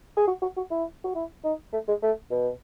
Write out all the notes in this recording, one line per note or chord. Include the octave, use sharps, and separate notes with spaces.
G#4
F#4
F#4
F#4
E4
F#4
E4
D#4
A3
G#3
A3
B2